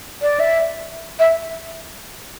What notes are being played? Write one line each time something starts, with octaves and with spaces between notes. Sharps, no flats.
D5
E5
E5